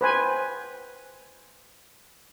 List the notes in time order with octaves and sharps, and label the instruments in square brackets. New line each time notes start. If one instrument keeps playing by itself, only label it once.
[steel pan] B4 C5 G#5